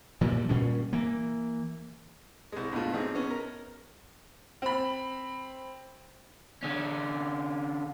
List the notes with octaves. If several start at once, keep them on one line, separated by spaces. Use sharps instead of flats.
A#2 E3 F3 G3
A#2 G3 C#4
E3 A#3
C2 G#3
G2 B2 A3 F4
A1 C4 D#4 G#4
B3 C#4
A#4
C4 B5
D3 C#4